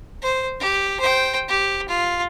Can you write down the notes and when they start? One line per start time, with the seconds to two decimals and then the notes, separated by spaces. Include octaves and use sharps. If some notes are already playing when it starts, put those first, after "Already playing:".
0.22 C5
0.60 G4
1.00 C5 G5
1.48 G4
1.88 F4